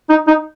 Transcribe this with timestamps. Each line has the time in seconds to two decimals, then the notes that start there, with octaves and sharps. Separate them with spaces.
0.10 D#4
0.27 D#4